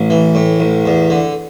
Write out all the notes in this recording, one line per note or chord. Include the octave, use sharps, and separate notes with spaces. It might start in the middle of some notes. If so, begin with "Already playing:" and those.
Already playing: A1
E3
A2
A1
E2
D3